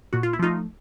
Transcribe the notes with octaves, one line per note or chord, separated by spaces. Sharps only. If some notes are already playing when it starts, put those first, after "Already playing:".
A#2 F#4
F4
E4
F3 A3 D#4 F4